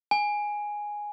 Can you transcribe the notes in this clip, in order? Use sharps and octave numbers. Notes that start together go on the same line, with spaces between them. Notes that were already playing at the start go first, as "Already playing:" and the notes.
G#5